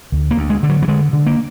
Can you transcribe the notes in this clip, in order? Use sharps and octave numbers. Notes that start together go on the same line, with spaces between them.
D2
A#3
D2
G#3
D3
F#3
F#3
D3 G#3
D3
A#3